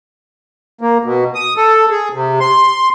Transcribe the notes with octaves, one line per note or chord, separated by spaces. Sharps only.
A#3
B2
D#6
A4
G#4
C3
C6